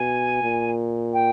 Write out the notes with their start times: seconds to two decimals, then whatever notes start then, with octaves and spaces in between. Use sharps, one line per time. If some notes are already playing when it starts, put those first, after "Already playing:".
Already playing: B2 G#5
0.42 A#2
1.13 G5